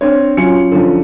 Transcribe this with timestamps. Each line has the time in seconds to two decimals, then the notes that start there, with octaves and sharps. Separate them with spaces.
0.01 C4 D4 C#5
0.37 F#3 C#4 F4 C#7
0.72 D3 F3